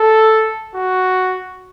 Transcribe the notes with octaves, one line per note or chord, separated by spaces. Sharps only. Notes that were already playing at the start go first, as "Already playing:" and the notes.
Already playing: A4
F#4